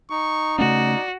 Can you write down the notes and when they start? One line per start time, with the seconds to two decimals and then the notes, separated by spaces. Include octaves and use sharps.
0.10 D#4 C#6
0.58 C#3 A3 C#4 F#4 D5